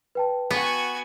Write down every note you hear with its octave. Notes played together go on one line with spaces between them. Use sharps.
B4 G5 A5
B3 F#4 G#5